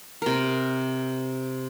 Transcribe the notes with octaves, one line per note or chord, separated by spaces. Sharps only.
C3 A#4